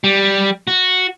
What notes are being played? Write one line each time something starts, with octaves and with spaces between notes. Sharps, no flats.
G3
F#4